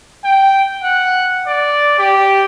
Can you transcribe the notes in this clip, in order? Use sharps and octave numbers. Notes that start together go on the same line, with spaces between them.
G5
F#5
D5
G4